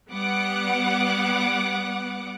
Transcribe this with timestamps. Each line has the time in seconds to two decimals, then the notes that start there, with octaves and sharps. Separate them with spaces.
0.11 G3 B3 F#5 D6